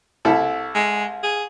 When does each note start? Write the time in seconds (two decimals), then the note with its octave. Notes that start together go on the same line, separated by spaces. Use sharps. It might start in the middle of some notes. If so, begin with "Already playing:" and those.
0.25 C2 E4 A4
0.75 G#3
1.23 G#4